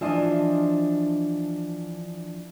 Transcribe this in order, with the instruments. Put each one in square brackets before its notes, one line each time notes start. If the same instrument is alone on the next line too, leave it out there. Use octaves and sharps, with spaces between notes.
[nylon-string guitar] E3 F3 D4 D#5